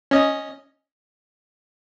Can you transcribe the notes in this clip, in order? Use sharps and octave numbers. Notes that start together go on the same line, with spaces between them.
C#4 D#5